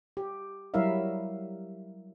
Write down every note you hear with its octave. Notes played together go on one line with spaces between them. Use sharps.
G4
F#3 G3 E4 A#4 E5 F5